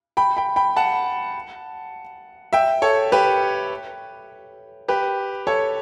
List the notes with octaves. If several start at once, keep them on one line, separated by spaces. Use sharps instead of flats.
G5 B5
G5 B5
G5 B5
F#5 A5
E5 G5
A4 C#5
G4 B4
G4 B4
A4 C#5